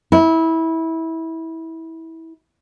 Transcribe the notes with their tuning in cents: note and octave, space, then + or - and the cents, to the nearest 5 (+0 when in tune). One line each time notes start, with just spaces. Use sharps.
E4 -20